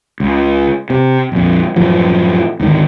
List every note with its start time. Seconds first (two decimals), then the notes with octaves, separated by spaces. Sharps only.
0.20 C#2
0.90 C3
1.32 A#1 F2
1.76 F#2 A2 E3 F3
2.60 D2 G#2 D#3